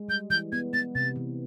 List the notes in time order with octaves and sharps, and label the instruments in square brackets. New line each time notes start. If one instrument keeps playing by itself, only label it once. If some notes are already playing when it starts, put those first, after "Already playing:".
Already playing: [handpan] G#3
[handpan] G3 [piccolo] G6
[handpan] E3 [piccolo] G6
[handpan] B3 [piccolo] G#6
[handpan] B3 [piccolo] A6
[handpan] C3 [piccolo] A6
[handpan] E3